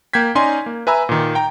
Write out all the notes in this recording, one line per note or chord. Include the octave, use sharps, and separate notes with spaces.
A#3 G5 G6 G#6 B6
C#4 D#4 D5 G#5 C6
A#3
B4 E5 G#5 A#5 B5 E6
A#2 D#3
G5 A#5